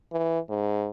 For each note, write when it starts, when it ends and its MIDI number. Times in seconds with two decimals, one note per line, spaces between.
0.12 0.39 52
0.49 0.90 44